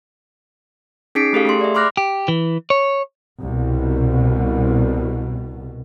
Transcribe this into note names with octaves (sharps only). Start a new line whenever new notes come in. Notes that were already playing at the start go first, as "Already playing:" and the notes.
C#4 D#4 G#4 B6 C7 D7
A3 G4 A4 F5
A3 G#4 C6
D5 E5
B5 C6 D6 F6 F#6 A#6
G4
E3
C#5
C2 B2